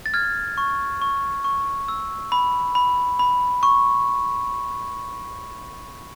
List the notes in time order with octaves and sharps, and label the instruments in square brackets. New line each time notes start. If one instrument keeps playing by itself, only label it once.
[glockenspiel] A6
F6 G#6
C#6
C#6
C#6
E6
B5
B5
B5
C#6